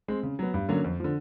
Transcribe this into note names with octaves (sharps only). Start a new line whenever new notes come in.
G#3 C4
C#3
F#3 B3
G2
D3 F#3 A#3 C#4
F2
D3 F3